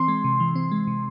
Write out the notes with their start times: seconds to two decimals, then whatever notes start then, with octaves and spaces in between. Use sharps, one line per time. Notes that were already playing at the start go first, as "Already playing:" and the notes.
Already playing: E3 C4 C6
0.08 G#3
0.24 C3
0.40 E3
0.55 C4
0.71 G#3
0.87 C3